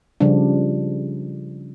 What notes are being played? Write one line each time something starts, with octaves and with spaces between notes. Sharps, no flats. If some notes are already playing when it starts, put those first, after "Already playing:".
C#3 F3 G3 D4